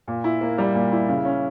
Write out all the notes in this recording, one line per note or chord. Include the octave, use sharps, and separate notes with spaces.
A#2
E4
A#3
G3
A#2
E4
C#3
C#4